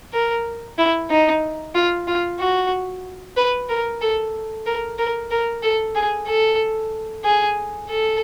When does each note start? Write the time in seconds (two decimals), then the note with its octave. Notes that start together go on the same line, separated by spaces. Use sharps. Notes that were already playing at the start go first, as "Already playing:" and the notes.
0.13 A#4
0.78 E4
1.10 D#4
1.75 F4
2.08 F4
2.40 F#4
3.37 B4
3.69 A#4
4.01 A4
4.66 A#4
4.99 A#4
5.31 A#4
5.63 A4
5.96 G#4
6.28 A4
7.25 G#4
7.89 A4